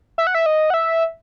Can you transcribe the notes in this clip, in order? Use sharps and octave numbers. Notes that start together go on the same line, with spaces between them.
E5
F#5
E5
D#5
F#5
E5